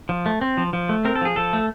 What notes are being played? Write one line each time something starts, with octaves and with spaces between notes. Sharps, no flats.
F3
A3
C4
F3
F3
A3
C4 A#4
A4
F3 G#4
F3 A4
A3